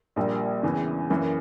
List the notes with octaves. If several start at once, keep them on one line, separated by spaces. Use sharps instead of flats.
A#1 A#2 G3
E2 C#3 E3
F#2 E3 A#3